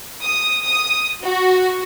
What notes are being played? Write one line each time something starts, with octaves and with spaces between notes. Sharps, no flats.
D#6
D#6
F#4